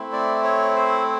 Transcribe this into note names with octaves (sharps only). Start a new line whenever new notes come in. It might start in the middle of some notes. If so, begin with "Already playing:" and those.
Already playing: A3 C4 E4
D5
C#5
C5